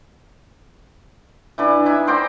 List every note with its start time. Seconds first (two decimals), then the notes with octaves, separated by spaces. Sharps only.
1.58 E3 D4 B4
1.86 D#4 E5 G#5
2.07 C5 D5 G5 A#5